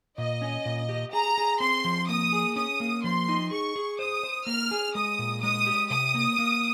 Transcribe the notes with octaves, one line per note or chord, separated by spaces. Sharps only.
A#2 D#5
C#4
A#2
G4
G#4 A#5
G#4
C4 C6
F3
A#3 D#6
G#4
C#4 D#6
A#3
F3 C6
D#4
G#4 C#6
G#4
C5 D#6
C5
A#3 F6
G#4
G#3 D#6
A#2
G#3 D#6
G4
C3 D#6
A#3
A#3